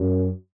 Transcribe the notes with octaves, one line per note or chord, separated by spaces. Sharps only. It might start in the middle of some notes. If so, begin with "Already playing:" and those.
Already playing: F#2